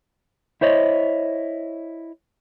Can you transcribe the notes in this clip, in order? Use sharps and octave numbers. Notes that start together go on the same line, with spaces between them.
E4 C5 C#5 D#5